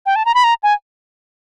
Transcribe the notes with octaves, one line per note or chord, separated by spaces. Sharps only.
G5
A5
A#5
B5
A#5
G#5